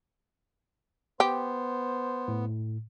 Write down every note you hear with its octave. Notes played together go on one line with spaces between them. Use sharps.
B3 G4 C5
A2